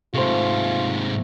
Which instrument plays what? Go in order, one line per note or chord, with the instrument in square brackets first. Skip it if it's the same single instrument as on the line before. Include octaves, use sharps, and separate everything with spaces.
[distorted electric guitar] G#2 C3 [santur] A3 C5 [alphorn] F4